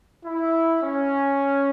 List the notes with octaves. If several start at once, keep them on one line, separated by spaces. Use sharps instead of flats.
E4
C#4